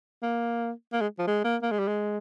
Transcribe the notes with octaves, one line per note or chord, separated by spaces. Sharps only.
A#3
A#3
G#3
F3
G#3
A#3
A#3
G#3
G3
G#3